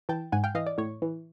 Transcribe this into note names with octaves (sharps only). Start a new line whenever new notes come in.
E3 G5 A5
G#2 F#5 G#5
F5 G5
E3 D#5 F5
D5
A2 C#5
E3